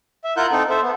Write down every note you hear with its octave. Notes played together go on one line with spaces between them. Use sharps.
E5
E4 F4 A#4 F#5 F#6 G6
C4 D#4 A4
A4 C5 E5
B3